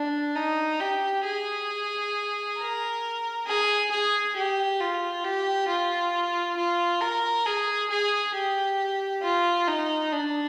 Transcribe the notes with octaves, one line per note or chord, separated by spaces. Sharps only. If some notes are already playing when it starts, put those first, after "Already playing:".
Already playing: D4
D#4
G4
G#4
A#4
G#4
G#4
G4
F4
G4
F4
F4
A#4
G#4
G#4
G4
F4
D#4
D4